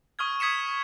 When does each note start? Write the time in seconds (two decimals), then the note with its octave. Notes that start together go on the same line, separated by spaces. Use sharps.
0.19 C#6 D#6 F6 G#6
0.40 D#6 G#6 B6 C#7 E7